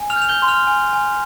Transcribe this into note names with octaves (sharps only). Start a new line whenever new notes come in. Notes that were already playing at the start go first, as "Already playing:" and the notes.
Already playing: G#5
F6 F7
G6
F7
G6 G7
C6
F6 F7
G#5
G#5